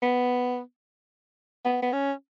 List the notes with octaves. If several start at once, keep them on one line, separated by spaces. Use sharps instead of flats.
B3
B3
B3
C#4